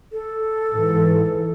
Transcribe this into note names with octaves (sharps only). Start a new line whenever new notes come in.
A4
G#2 E3